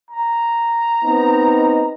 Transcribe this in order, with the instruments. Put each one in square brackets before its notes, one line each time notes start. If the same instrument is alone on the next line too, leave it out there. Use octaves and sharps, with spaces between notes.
[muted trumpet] A#5
[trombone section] B3 C4 D#4